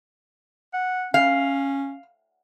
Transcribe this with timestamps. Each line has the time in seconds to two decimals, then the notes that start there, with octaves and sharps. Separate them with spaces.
0.74 F#5
1.14 C#4 F5